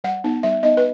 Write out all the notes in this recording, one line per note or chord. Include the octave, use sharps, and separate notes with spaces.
G3 F#5
B3 D#4
G3 E5
B3 D#4 D#5
B4